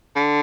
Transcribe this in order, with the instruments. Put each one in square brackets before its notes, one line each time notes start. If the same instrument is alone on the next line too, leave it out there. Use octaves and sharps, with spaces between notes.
[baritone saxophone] D3